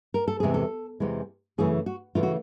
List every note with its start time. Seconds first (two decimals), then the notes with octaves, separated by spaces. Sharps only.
0.14 A#4
0.28 A4
0.40 E2 C3 E3 G#3 G#4
0.54 A4
1.00 E2 C3 E3 G#3
1.58 F#2 C#3 E3 A3 G#4
1.86 F#4
2.15 C#3 E3 A3 F4
2.23 F#4